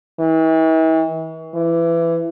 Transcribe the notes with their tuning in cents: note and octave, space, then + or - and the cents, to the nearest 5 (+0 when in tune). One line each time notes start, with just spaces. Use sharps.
E3 -40
E3 +20